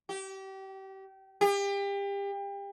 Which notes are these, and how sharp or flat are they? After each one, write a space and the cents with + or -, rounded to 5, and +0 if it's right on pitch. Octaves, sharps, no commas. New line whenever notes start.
G4 -30
G4 +30